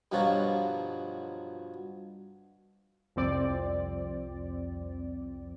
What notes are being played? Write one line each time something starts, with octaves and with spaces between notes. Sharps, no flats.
G2 B2 F3 F#3 F4 F#4
C2 F2 C4 D5